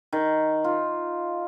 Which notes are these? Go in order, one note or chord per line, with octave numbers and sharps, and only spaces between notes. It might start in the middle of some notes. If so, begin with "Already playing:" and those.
D#3
F4